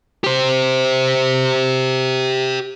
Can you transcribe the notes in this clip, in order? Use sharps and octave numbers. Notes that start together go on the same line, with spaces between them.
G4 C5